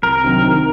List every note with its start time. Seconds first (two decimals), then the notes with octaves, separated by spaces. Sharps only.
0.03 C2 A#4
0.24 C3 D#3 F#3 C4
0.43 D#3